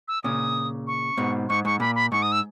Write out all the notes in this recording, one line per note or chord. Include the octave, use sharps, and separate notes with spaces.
E6
A#2 C#3 D#6
C#6
G#2 B2
G#2 C#6
G#2 C#6
A#2 B5
B5
G#2 C#6
D#6
E6